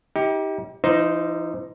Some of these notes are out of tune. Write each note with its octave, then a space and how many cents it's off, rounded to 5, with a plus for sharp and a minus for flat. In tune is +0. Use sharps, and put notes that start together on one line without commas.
D#4 +40 G4 +0
E3 +40 D#4 +0 C5 +0